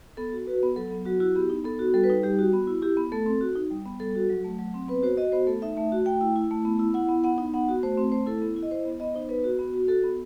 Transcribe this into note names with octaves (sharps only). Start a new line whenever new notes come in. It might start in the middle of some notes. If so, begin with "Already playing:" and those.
B3 A4
F#4
F#4 B4
B3
F#3 A4
B3
F#3 F#4
E4 F#4
B3 G4
D#4
B3 A4
F#4
G3 A4
B4
D#4
G3 G4
F#4
B3
E4
E4 G4
B3
A3 A4
C4
F#4
D#4
G3
B3
G3 A4
F#4
F#3
A3
F#3
C4
B3 B4
F#4 C5
F#4 D#5
B3 C5
A3 A4
D#4 E5
A3 E5
F#4
A3 G5
E4
E4
A3
B3
E4
E4 F#5
B3
B3 F#5
D#4
B3 F#5
F#4
A3 C5
C4
A3 C5
E4 A4
B3
E4
D#5
E4 C5
B3
B3 D#5
D#4 C5
B3 B4
F#4
B3
F#4
F#4 A4
B3